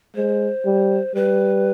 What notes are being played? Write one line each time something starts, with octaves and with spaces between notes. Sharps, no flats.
G#3 C5
G3
G3 B4